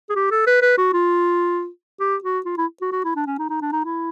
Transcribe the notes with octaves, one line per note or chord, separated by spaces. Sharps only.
G#4
G4
A4
B4
B4
F#4
F4
G4
F#4
F4
E4
F#4
F#4
E4
D4
C#4
D#4
D#4
D4
D#4
E4